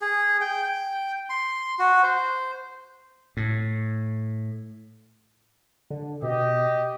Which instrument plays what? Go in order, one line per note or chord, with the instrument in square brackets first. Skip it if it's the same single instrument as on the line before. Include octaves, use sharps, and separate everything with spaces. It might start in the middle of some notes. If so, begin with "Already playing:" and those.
[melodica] G#4
G5
G5
C6
F#4
C5
[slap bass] A2
[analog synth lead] D3
[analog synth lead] B2 [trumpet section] G4 D#5